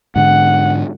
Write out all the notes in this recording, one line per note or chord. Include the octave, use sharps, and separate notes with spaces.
G#2 D3 F#5